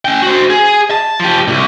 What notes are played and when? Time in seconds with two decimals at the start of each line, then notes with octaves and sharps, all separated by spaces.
0.05 C#4 G5
0.22 F#4 C5
0.50 G#4
0.91 A5
1.20 F3 G4
1.48 C2 A#2